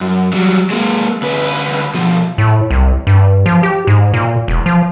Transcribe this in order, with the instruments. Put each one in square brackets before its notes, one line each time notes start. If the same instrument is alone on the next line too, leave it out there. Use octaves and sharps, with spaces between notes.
[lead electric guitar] F#2
F#3 G3
G#3 A#3
D2 B4
B2 F3
[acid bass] A2
C2
G2
F3
G4
G#2
A#2
E1
F3